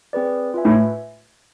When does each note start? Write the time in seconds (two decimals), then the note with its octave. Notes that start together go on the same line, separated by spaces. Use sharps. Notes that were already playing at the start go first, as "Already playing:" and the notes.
0.13 C4 G#4 B4 D5
0.54 F4 B4 E5 G#5
0.65 A2